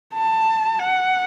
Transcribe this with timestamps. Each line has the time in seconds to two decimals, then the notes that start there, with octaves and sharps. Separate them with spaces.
0.14 A5
0.79 F#5